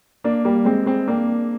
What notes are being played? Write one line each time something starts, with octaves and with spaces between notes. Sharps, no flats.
A#3 D4
G3 A#3
G#3 C4
G#3 C4
A#3 D4